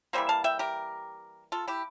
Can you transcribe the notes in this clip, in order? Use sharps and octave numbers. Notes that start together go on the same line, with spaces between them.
E3 G3 A#3 C5 E5
F5 A5
E5 G5
G4 A#4
F4 A4
E4 G4